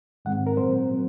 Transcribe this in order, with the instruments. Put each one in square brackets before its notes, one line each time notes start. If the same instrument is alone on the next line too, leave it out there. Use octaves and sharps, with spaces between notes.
[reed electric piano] G#2 D#3 G#3 C4 F#5
A#4
A#2 F#3 C4 C5
F#3 C4